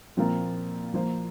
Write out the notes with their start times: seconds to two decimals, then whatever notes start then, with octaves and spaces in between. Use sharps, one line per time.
0.17 A#2 F3 C4 F4 A#4
0.94 F3 A#3 F4 C5